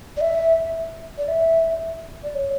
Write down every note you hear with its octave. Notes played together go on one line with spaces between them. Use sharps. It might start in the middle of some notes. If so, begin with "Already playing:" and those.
D5
E5
D5
E5
D5
C#5